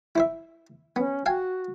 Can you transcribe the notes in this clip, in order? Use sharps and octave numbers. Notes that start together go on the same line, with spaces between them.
E4 C5 E5
B3 C#4
F#4 F5 G5 G#5